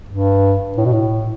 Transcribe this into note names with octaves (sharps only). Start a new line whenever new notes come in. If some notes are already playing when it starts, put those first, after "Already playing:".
G2
A2
B2
A2